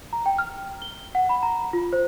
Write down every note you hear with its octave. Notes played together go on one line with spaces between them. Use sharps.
A#5
G5
F6
G7
F#5
B5
A#5
F4
C5